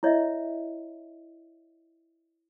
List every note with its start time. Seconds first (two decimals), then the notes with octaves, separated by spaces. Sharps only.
0.03 E4 C#5 D#5 E5